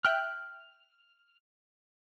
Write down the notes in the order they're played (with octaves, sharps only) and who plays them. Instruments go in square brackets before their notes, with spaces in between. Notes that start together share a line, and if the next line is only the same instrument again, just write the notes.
[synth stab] E5 G5 F#6 [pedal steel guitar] F6